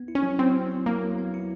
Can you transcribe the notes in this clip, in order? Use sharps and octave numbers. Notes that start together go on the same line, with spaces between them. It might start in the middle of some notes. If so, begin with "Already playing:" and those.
Already playing: B3
E4
C#4
F#3
F#3 C4
B3
E4
F#3 A#3
F#3
B3
E4